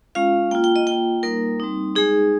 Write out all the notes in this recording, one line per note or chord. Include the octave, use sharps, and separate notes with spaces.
G#3 C#4 F4 F5
A#3 F4 G5
G5
D#5
A#3 F4 G5
G3 A#3 D#4 A#4
G3 C4 D#4
G#3 D#4 G#4